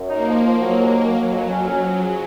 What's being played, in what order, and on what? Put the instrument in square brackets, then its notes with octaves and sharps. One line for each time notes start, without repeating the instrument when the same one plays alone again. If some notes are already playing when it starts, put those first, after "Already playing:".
Already playing: [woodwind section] F#2
[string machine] A#3 [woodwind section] D#4
[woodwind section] F3
F3
F#3
D#2
D#2
[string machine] F#3 [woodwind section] A#3
[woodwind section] F2
C#4
C#4
F3
G#4